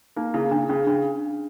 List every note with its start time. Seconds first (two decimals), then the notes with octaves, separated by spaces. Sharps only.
0.16 A#3 D#4
0.34 C#3 E4
0.51 C#3 D4
0.69 C#3 C#4
0.87 C#3 D4